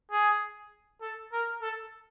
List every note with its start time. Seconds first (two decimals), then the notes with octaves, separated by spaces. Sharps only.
0.12 G#4
1.02 A4
1.32 A#4
1.62 A4